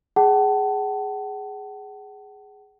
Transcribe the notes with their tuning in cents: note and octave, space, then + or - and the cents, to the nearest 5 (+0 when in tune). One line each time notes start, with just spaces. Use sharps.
G#4 +0 F#5 +40 A5 +0